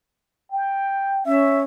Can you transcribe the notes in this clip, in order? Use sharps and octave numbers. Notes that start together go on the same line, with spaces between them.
G5
C#4 E5